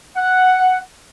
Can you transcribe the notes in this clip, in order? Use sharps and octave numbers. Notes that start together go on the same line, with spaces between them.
F#5